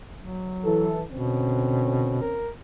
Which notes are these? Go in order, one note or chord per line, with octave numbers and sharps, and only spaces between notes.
F#3
E3 A4
B2 D3 C4 C#4
A#4